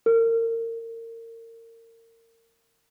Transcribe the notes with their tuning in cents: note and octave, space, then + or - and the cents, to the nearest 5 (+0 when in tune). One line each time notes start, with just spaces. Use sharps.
A#4 -30